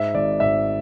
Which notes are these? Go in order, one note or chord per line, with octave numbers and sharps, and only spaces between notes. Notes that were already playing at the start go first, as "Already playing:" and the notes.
Already playing: G#2 E5
G#1 D5
G#1 E5